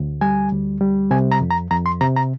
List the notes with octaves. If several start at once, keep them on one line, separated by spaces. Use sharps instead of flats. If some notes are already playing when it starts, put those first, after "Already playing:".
Already playing: D2
G3 G#5
D2
G3
C3 G#5
A#5
F2
A#5
F2 A#5
C6
C3 A#5
A#5